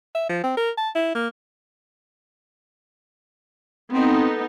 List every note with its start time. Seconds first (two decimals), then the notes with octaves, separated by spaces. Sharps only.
0.15 E5
0.29 F3
0.44 C4
0.57 A#4
0.77 A5
0.95 E4
1.15 A#3
3.92 B3 C4 D#4 A4